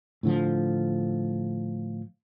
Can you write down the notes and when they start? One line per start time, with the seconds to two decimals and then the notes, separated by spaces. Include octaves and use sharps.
0.23 A2 D3 F3